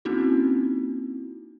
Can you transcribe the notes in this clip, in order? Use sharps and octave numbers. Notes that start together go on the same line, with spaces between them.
A#3 C4 C#4 D#4 E4 F#4